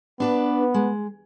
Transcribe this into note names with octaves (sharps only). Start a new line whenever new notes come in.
B3 D4 B4 D5
G#3